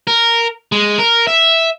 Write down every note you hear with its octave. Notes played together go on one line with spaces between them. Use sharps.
A#4
G#3
A#4
E5